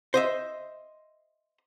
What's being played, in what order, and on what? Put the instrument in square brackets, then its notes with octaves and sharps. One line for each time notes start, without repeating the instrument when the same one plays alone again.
[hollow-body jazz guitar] C5 D#5 E5